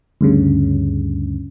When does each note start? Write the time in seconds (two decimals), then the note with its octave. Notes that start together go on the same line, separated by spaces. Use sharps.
0.21 D2 G2 C#3